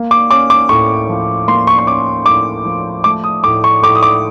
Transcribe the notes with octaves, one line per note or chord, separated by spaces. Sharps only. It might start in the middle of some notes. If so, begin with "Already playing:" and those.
Already playing: A#3
D6
C#4 D6
D6
A2 C#6
F3
A#3 C6
C#6
C#6
C#4 D6
A2 D6
F3
A3 D6
D#6
A2 D6
C#6
A2 D6
D#6
D6